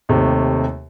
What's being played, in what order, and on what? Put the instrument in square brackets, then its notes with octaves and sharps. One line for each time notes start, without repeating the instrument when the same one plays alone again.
[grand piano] D#2 C3 A3